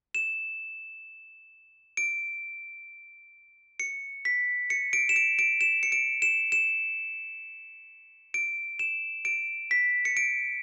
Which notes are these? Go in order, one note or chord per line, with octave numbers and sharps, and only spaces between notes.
E7
D7
C#7
B6
C#7
D7
E7
D7
D7
E7
C#7
D7
E7
E7
D7
E7
D7
B6
C#7
D7